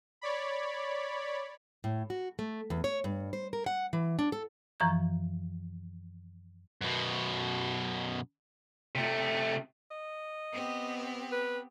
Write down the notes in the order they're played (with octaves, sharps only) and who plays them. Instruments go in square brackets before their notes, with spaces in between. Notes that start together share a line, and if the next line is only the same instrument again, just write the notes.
[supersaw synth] C#5 D5 B5
[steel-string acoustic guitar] A2
F#4
A3
E2
C#5
G2
C5
A#4
F#5
E3
D4
A4
[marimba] F#2 E3 F3 A#5 C#6 G6
[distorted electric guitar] F#2 B2
C3 A3
[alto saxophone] D#5
[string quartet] B3 C4 G4
[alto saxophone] B4